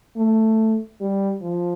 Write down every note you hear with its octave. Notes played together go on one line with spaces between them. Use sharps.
A3
G3
F3